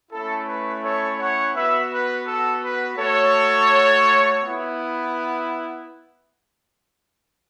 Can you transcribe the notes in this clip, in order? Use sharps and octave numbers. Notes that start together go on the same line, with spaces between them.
A3 C#4 E4 A4
B4
A4 C#5
C#5 F#5
B3 F#4 B4 E5
B4
A4
B4
A3 F#4 A4 C#5
B3 E4